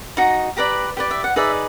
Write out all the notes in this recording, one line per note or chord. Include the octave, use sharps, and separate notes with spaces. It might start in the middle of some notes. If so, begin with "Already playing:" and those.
D#4 F#4 A#5
G4 B4 D5 A#5
G4 B4 D5
E5
F#5
D#4 G#4 B4 D5 E5